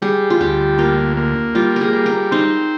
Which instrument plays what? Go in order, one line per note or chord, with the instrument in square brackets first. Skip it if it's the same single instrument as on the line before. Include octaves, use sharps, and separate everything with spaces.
[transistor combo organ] G3 [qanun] G#4
[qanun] F4
[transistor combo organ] D2 [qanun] G4
[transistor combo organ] A#3 [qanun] F4
[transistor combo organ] A#3
[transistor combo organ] G3 [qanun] F4
[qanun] G#4 A#4
[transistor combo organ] G3
[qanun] A#4
[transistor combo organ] C4 [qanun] D#4